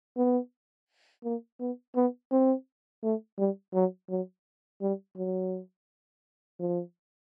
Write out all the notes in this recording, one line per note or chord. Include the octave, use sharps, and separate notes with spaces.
B3
A#3
B3
B3
C4
A3
G3
F#3
F#3
G3
F#3
F3